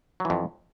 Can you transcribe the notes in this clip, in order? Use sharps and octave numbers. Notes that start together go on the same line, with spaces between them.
F2 E3 F#3